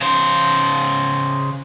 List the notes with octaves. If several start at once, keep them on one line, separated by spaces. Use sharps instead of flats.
C#3 C5